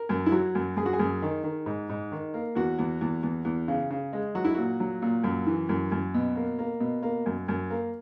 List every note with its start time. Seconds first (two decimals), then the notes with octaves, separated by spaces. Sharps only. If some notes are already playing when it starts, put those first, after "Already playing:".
Already playing: A#4
0.09 F#2
0.26 E4
0.32 F#3 F#4
0.55 F#2
0.76 F#2 G#4
0.86 F#4
0.93 G#4
0.99 F#2
1.22 D#3
1.43 D#3
1.66 G#2
1.89 G#2
2.12 D#3
2.34 A#3
2.55 E2 F#4
2.79 E2
3.01 E2
3.23 E2
3.45 E2
3.68 C#3
3.90 C#3
4.13 G#3
4.35 F#3 F#4
4.45 E4
4.55 A#2 F#4
4.80 F#3
5.02 A#2
5.24 F#2
5.47 E3
5.69 F#2
5.92 F#2
6.14 B2
6.36 A#3
6.59 A#3
6.80 B2
7.03 A#3
7.26 F#2
7.48 F#2
7.70 A#3